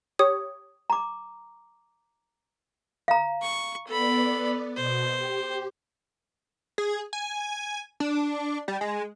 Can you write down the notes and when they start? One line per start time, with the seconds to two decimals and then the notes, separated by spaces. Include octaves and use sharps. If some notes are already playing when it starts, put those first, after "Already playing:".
0.19 G4 C#5 D#6
0.90 A#5 D6
3.08 F5 A#5
3.41 C#6
3.87 B3 A4 D5 B5
4.76 B2 C5
5.15 G4
6.78 G#4
7.13 G#5
8.00 D4
8.68 G3
8.81 G#3